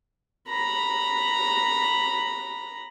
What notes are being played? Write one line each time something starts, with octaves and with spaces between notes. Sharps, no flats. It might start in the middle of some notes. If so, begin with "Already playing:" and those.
A#5 B5